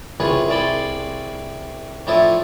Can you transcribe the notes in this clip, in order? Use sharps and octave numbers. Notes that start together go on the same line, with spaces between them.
C2 C#3 F4 G#4 B4 C#6
C2 G#4 D5 A5 B5 C6
A2 F3 D4 E4 A4 D#6